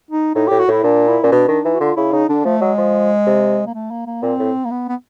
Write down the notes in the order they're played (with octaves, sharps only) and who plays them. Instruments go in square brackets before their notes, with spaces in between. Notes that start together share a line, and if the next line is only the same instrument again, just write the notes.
[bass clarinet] D#4
[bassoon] A2 [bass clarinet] D#4
[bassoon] A2 [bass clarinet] G4
[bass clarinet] F#4
[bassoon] A2 [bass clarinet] E4
[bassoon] A#2 [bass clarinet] D4
[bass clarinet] E4
[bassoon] A#2 [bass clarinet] C#4
[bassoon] B2 [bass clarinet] D4
[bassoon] D#3 [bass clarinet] D4
[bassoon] E3 [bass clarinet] D#4
[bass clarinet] F#4
[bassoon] D3 [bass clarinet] F4
[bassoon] C#3 [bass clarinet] E4
[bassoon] C#3 [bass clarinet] D#4
[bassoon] D3 [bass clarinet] D4
[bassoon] F3 [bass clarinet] A3
[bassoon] F#3 [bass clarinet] G#3
[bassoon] F3
C3
[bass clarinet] A#3
A3
A#3
A#3
[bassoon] A#2 [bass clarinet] C4
[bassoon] A2
[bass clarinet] A#3
B3
B3